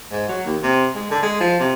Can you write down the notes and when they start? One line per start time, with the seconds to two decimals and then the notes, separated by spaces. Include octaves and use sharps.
0.12 G#2
0.29 F#3
0.45 D#2
0.63 C3
0.95 G#3
1.11 D3
1.23 G#3
1.40 F3
1.60 C3